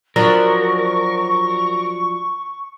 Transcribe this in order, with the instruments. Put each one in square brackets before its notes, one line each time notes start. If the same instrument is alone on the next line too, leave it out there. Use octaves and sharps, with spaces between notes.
[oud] F3 F#3 D4 [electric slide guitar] A#4 [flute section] C#6